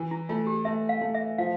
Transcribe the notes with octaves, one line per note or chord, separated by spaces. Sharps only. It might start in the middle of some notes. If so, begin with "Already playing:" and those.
Already playing: E3
E4
A3 F4
G4
A3 E5
F5
A3
E5
F3 F5